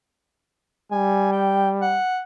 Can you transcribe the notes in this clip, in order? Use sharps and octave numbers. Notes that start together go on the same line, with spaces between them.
G3 G#5
G5
F#5